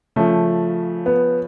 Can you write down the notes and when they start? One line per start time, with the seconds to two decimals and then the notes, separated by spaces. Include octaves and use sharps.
0.16 C#3 F3 A3
1.06 B3